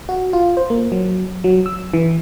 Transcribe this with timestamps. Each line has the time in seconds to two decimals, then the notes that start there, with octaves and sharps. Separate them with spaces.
0.09 F#4
0.33 F4
0.57 C5
0.70 A#3
0.92 F#3
1.44 F#3
1.66 E6
1.94 E3